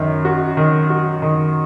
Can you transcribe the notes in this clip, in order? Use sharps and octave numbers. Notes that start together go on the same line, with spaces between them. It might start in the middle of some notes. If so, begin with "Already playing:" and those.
Already playing: F#2 D#3
F#4
D#3
F#4
D#3